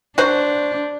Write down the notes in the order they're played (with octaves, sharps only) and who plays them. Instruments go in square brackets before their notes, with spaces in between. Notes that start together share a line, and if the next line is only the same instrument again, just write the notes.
[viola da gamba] D4 [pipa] F#4 C5